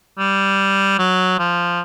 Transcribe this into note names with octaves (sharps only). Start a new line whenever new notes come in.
G3
F#3
F3